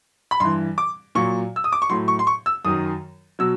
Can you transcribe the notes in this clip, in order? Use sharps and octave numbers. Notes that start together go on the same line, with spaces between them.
B5
G2 E3 C6
D6
A#2 F#3 C#6
E6
D#6
D6
C#6
A2 F#3 C6
C#6
C6
C#6
E6
F#2 D#3 F#3 D#6
B2 F#3 E6